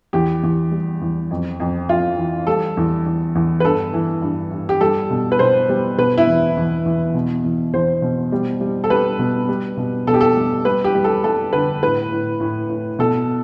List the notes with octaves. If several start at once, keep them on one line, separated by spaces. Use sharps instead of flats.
E2 G4
E2
G3
E2
F2
F2
F2 F4
E3
G3 A4
E2
E2
E2
B4
G2 A4
E3
G2
G2
G4
G3 A4
B2
B4
B2 C5
G3
B2 B4
E4
E2
E2
E2
B2
E2
E2 C5
B2
G3
G3
A4
G3 B4
B2
G3
B2
B2 A4
G4
A4
G3
G3 B4
G4
G3
A4
G3 A4
D3 B4
A2 B4
A2
A2
A2
B2 A4